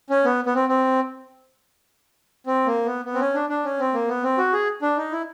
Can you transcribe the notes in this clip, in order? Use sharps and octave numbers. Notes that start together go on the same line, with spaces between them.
C#4
B3
B3
C4
C4
C4
A#3
B3
B3
C4
C#4
D4
D4
C#4
C4
A#3
B3
C4
F#4
G#4
D4
D#4
E4